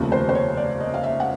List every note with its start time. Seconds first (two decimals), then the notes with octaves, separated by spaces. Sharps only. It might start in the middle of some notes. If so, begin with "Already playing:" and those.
Already playing: F1 D#2 C#3 F3 A3
0.12 C5
0.29 C5
0.35 C#5
0.57 D5
0.80 D#5
0.94 F5
1.03 E5
1.20 F#5